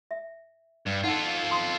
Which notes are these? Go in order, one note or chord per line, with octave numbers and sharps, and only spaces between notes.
E5
G2
D#4 F4 A4 F#5
C6 D#6